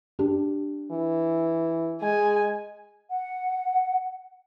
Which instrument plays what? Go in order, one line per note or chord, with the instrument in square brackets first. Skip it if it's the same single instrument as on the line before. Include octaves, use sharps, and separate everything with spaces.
[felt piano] D4 G4
[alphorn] E3
[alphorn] G#3 [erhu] G#5
[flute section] F#5